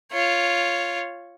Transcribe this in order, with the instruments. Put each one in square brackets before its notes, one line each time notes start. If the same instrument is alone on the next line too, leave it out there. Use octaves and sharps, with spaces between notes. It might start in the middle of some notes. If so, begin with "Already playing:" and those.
[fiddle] F4 C#5